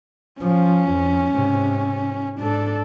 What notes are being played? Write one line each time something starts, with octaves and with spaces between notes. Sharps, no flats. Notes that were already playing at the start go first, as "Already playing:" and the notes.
F3 C#4
F2
G#2 C3
G#2 D4 A4